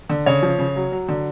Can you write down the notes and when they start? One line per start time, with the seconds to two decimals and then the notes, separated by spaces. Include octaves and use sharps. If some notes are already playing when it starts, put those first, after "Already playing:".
0.10 D3
0.26 C#3 C#5
0.43 F3
0.59 C#3
0.76 F#3
0.92 F#3
1.08 D3